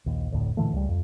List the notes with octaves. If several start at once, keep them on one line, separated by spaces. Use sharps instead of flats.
A#1 D#2
F1 D2 A2
A#2 D3 E3 A3
C#2 G3
F2